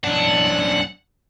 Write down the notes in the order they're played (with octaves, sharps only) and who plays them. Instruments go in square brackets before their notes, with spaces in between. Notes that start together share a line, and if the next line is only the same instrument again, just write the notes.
[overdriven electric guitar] B1 D4 [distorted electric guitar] F#5